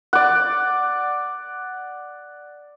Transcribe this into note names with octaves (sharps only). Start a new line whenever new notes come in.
D5 F#5